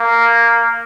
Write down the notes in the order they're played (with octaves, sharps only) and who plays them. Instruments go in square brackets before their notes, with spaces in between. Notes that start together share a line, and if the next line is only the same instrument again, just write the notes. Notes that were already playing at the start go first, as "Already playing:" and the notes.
Already playing: [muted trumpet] A#3